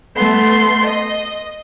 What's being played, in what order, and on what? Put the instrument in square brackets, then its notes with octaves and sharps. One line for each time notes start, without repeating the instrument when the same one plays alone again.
[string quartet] A3 B3 C6
D#5